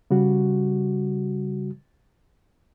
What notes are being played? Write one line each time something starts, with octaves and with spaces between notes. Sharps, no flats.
C#3 G3 F#4